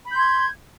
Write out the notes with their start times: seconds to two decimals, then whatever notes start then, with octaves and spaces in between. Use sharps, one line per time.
0.05 B5
0.10 G6
0.14 C6
0.19 G#6